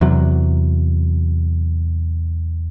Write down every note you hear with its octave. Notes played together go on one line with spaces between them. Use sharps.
E2 C3 F#3